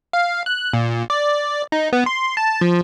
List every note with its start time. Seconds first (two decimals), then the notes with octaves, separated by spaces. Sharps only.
0.13 F5
0.46 F#6
0.74 A#2
1.10 D5
1.72 D#4
1.93 B3
2.06 C6
2.37 A5
2.61 F3